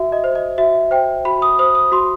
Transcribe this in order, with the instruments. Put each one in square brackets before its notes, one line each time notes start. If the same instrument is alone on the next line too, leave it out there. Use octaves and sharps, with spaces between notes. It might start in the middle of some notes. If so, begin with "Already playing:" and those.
Already playing: [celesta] F#4 E5
D#5
C5
D#5
F#4 E5
C5 G5
F#4 B5
D#6
C5 D#6
D#6
F#4 C6